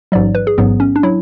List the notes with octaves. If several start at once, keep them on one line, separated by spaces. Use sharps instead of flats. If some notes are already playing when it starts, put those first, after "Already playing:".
A1 G#2 F#3 D5
B4
G#4
A1 G#2 F#3 B3
C#4
D4
F#3 E4